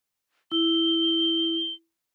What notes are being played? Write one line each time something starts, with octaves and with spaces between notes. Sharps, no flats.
E4 G7